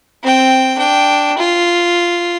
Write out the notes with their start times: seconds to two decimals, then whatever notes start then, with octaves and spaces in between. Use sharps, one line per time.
0.23 C4 G5
0.78 D4 G5
1.38 F4